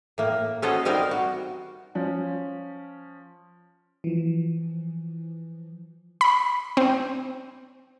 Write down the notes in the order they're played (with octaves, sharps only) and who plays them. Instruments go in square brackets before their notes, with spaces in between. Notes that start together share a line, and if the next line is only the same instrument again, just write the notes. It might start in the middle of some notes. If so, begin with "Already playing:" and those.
[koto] A2 A#3
C#4 F#4 A4 C5 D#5 A#5
G3 C4 D#4 A#4 C5 F5
F#4
[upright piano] F3 C#4
[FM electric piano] E3 F3
[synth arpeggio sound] B5
C4